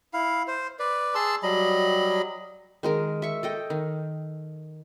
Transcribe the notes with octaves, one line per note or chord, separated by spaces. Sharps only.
E4 F5
C5
B4 D5
G#4 A5 C6 E6
F#3 G3 D#5 B5
D#3 G#3 A#4
E5 C#6
A4 D#5 G5
D#3